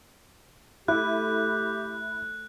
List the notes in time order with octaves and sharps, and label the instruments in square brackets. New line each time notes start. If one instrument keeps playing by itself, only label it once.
[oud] A3 [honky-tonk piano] E4 [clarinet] G4 [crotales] F#6